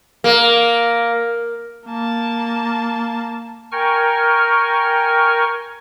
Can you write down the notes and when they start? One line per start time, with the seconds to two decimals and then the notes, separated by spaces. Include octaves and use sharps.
0.24 A#3
1.87 A#3 A5
3.72 A#4 G5 G#5 C#6 F6